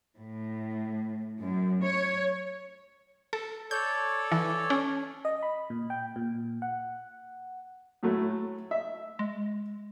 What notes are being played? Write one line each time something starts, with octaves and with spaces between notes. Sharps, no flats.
A2
F#2
C#5
A4
A4 C#5 D5 G6
E3
C#4
D#5
B5
A#2
G5
A#2
F#5
A2 F#3 A3
E5
G#3